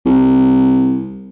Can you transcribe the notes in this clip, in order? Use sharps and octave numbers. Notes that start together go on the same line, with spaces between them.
C2